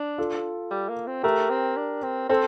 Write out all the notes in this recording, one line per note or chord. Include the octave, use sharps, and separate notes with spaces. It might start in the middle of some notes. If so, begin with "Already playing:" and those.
Already playing: D4
F4 A4
G3
A#3
C4
A3 G4 A#4
C4
D4
C4
C4 A4 C5